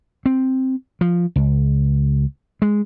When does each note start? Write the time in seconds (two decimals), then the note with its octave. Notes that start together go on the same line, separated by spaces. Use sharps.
0.26 C4
1.01 F3
1.36 C#2
2.62 G#3